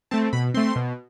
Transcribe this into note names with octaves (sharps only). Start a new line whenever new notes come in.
A3 C4 A5
B2 B5
A3 C4 C6
B2